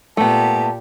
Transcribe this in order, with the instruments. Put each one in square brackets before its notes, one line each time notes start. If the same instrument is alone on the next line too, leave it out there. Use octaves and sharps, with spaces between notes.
[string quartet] A#2 G4 [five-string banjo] A3 B3 [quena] A5